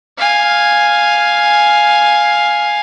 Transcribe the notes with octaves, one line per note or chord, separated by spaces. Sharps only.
F5 G#5